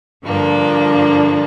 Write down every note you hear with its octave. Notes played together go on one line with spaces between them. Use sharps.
G2 D3 F3 A#3 D4